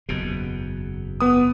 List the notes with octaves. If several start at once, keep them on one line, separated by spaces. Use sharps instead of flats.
F#1 E2 B2
B3 D#6